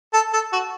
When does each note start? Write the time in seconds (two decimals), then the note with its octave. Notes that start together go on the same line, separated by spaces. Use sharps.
0.14 A4
0.33 A4
0.53 F#4